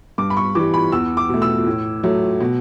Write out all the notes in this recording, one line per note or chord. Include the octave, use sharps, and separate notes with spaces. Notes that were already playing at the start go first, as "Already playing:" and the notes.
G2 D6
B5
C#6
E3 G3 D6
B5
E2 E6
D6
B2 A3
E6
A2
F#3 A3
B2